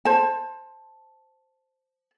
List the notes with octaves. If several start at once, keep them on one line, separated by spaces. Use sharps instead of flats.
C5 A5